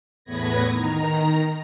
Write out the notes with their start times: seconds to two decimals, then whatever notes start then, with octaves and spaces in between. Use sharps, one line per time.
0.24 E2 A2 B3 B4 G#6 A#6
0.71 D#3 A#5